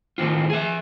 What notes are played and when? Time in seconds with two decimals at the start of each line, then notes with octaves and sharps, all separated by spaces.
0.18 A2 D#3 C4 F4
0.50 G#4 E5